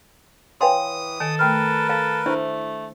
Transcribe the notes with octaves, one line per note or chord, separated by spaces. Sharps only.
E3 B4 C#5 F5 G5 G#5 C6 D#6
D#3 A4 G#5
A3 A#4 B4 G5 F6
A4 F5 A5
A3 D4 E4 C5 E5